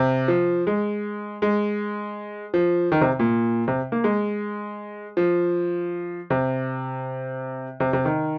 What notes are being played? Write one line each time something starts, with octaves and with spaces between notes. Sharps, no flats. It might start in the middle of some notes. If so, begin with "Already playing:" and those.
Already playing: C3
F3
G#3
G#3
F3
D#3
C3
A#2
C3
A#3
G#3
F3
C3
C3
C3
D#3